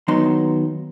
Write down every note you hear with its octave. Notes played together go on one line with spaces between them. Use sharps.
D#2 F#3 B3 D#4 C6